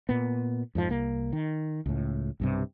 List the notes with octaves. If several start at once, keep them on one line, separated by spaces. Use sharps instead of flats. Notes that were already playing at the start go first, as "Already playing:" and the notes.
A#2 B3
F2 G#2 F3
C2 A#3
D#3
C#2 A2
B1 G2 C3